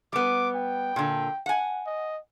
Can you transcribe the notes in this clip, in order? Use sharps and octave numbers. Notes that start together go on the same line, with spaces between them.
G3 B3 D6
G5
A#2 D3
F#5 G#5
D#5